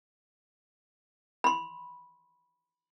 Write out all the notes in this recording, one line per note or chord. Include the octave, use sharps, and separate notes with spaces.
B5 C6